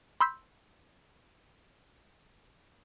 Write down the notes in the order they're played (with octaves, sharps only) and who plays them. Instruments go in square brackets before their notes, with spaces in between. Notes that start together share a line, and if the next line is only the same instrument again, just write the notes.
[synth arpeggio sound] B5 C6 E6 G6 B6